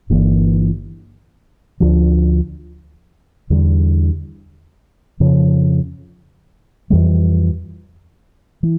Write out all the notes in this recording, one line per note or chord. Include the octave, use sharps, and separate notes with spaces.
G1 G2 E3 A#3
D2 D3 F3
E2 D3 G3
F2 C#3 F3
F2 E3 G3
E3